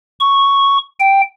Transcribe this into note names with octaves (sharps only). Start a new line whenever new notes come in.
C#6
G5